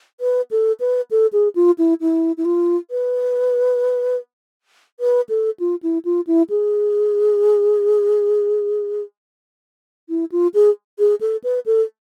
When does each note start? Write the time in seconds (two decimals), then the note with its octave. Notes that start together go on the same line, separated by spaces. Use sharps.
0.21 B4
0.51 A4
0.80 B4
1.11 A4
1.33 G#4
1.55 F4
1.78 E4
2.01 E4
2.37 E4
2.45 F4
2.91 B4
5.00 B4
5.29 A4
5.60 F4
5.83 E4
6.05 F4
6.27 E4
6.50 G#4
10.09 E4
10.32 F4
10.54 G#4
10.99 G#4
11.21 A4
11.44 B4
11.66 A4